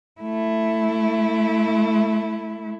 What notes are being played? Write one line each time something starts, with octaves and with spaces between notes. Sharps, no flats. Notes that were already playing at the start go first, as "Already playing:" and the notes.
A3 E4